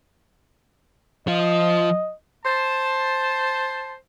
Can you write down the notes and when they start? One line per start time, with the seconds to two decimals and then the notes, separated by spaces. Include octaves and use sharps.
1.27 F3 F4 D#5
2.44 C5 A5